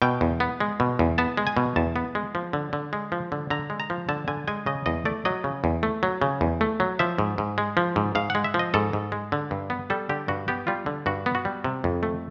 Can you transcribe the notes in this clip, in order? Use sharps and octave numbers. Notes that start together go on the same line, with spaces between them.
B2 G5
E2
B3
G#3
B2
E2
B3 A5
G#3
G#5
B2
E2 A5
B3
G#3
F3
D3
D3
G#3
F3
D3
D3 A#5
G#3
A#5
F3
D3 A5
D3 G#5
G#3 G#5
C#3 D#5
E2 D#5
A3 D5
F#3 D#5
C#3
E2
A3
F#3
C#3
E2
A3
F#3
F3 E5
G#2
G#2
G#3
F3
G#2
G#2 F5
G#3 F#5
E5
F3
D#5
G#2 A4
G#2
G#3
D3
G2
B3
G3 A4
D3 G4
G2 F#4
B3 G4
G3 F4
D3
G2 F#4
B3
F#4
G3
C3
F2
A3